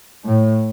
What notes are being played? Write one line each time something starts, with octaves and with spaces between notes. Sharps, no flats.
A2